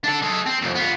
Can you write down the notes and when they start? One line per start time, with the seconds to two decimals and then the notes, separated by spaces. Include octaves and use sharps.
0.04 D4 A4
0.22 G#3 A4
0.46 C4
0.61 C2 F2
0.75 B3 F4